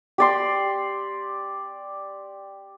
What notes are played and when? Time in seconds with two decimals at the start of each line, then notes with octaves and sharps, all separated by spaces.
0.18 G4 D5 C6